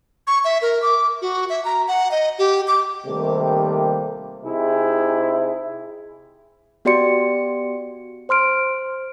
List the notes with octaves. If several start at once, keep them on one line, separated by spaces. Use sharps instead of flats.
C#6
E5
A#4
D6
F#4
E5
A#5
F#5
D#5
G4
D6
C3 D#3 G3 A3 A#3
C3 D#4 E4 G#4
B3 F#4 G4 D5 C6 C#7
C5 C6 F6 D7